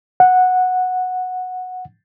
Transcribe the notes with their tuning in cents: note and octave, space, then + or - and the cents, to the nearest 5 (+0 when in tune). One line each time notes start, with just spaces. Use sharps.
F#5 -10